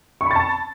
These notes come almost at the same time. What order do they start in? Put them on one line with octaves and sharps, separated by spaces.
C#6 B5 A6 A5